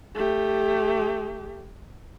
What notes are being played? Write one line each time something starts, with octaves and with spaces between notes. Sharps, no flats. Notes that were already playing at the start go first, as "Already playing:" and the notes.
A3 G4